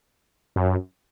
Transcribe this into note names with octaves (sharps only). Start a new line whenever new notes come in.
F#2